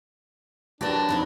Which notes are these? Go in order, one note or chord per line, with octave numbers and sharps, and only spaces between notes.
F#2 D4 F#4 G4 B4 A5
F2 C4 D#4 A4 B5